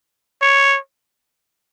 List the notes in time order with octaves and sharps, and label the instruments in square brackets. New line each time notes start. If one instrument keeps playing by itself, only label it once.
[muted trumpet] C#5